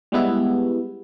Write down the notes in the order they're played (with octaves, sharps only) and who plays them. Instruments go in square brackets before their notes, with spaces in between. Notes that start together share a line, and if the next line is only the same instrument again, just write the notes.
[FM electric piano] G3 G#3 B3 E4